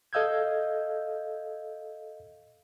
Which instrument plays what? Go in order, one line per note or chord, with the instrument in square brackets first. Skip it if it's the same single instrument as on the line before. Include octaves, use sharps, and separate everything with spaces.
[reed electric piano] A4 D#5 F5 E6 G6 G#6